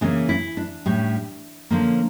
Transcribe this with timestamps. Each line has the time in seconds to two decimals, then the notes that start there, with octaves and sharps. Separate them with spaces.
0.01 C#3 E3 A#3 C#4 D4
0.29 E4
0.57 D4
0.86 A2 G3 C#4
1.70 D3 F3 A#3 C#4